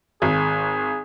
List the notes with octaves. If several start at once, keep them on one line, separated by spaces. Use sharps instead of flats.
G#1 G#4